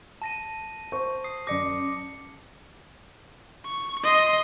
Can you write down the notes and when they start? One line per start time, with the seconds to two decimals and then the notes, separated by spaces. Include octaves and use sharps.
0.22 A5 A#6 D#7
0.92 C5 C#6
1.24 D#6 C7
1.47 F#2 D5 D6 A#6 C#7
3.66 C#6
4.04 D#5 C6